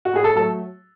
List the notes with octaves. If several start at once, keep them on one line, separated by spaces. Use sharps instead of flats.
F#4
A2 G#4
A4
F#3 A3 A4